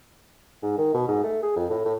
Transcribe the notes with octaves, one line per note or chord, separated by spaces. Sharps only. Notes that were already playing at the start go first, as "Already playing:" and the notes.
G#2
D#3
B2
G#2
A3
G#4
F2
A2
A2